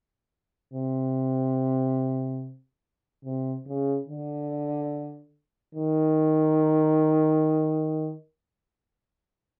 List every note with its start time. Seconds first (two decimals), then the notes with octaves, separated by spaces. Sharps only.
0.73 C3
3.24 C3
3.66 C#3
4.08 D3
5.75 D#3